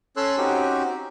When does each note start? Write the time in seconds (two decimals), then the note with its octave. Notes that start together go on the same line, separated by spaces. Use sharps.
0.17 C#4 A4 C#5 C6 E6 F#6
0.37 C4 C#4 D#4 F#4 G4